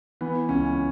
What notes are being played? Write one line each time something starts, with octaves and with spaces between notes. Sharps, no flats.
E3 B3
C#2 C#4